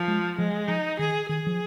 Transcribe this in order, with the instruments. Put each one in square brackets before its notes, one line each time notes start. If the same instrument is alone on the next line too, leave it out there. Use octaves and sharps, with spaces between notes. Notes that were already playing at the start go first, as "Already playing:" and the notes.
Already playing: [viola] F3
[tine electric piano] G#3
[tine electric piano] F3 [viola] G#3
[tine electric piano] F3 [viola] D#4
[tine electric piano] D#3 [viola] G#4
[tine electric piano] D#3 [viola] G#4
[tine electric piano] F3